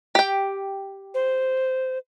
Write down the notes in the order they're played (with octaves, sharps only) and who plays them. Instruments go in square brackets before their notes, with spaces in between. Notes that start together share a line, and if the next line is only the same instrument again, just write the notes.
[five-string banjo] G4 G5
[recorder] C5